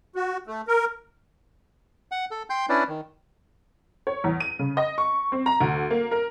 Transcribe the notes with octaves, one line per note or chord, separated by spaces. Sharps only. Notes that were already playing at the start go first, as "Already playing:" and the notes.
F#4
A3
A#4
F#5
A4
G5 C6 G6
C#4 D4 E4 B4 D5
D#3
C#5
E2
D#7
C#3
D#5
C#6
C4
A#5
D2
A#3
A#4